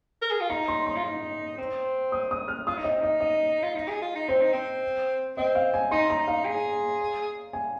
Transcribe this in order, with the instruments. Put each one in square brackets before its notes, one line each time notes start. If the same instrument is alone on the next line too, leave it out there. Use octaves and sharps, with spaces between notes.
[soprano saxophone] A#4
G#4
F4
[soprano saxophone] D#4 [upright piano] A#5
[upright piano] C6
C6
[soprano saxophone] F4
D#4
C4
[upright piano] D#6
D#6
F6
[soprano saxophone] F4 [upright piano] D#6
[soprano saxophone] D#4
[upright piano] D#5
[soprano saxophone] C4
[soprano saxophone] D#4 [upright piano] D#5
[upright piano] D#5
[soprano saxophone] F4
D#4
G#4
F4
D#4
[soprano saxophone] C4 [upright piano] C5
[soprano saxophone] D#4
C4
[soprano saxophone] C4 [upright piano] D#5
[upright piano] F5
G#5
[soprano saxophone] D#4 [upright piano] C6
[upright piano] A#5
[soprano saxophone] D#4
[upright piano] F5
[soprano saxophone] G#4
[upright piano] G#5